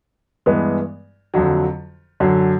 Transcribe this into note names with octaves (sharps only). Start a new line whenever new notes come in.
G2 E3 G#3 B3
F2 D3 F#3
F#2 D3 F#3